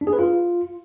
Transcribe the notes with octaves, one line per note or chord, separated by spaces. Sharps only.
D4
G#4
B4
F4